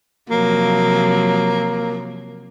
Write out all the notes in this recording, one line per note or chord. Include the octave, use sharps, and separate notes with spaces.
C3 F3 F#3 A#3